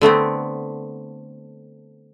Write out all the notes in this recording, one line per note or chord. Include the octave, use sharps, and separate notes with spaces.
D3 A3 B3 C4